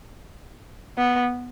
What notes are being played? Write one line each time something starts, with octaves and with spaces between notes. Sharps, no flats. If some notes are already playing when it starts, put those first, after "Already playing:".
B3